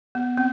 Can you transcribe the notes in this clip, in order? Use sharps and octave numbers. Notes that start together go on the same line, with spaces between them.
B3
C4